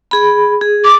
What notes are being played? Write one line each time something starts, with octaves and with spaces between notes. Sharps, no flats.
G#4 B5
G#4
D6